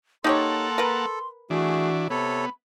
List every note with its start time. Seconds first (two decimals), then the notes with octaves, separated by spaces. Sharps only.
0.24 A#3 D#4 G4 A4 C#5 F#5 A5 C6
0.78 A#4 B4
1.50 E3 A3 D4 F#4 G#4
2.10 C3 B3 A4 C#5 B5